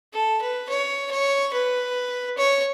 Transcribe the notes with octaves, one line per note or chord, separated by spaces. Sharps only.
A4
B4
C#5
C#5
B4
C#5